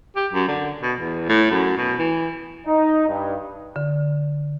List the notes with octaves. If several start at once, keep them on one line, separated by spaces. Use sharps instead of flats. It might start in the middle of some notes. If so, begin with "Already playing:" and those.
G4
F#2
D3
B2
E2
A2
F#2
B2
E3
D#4
G2
D3